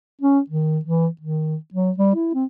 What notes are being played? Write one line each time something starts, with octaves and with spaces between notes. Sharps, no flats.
C#4
D#3
E3
D#3
F#3
G3
E4
C4